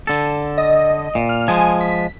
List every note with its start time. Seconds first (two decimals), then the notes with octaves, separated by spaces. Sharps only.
0.07 D3 A4
0.58 D#5
1.15 A#2
1.29 F6
1.48 F3 G#3 G#5
1.81 B6